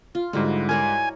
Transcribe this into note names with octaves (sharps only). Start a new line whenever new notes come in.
F4
G#2 D3 G3 G#3 E4 F#4
A#4 C#5 D5 G#5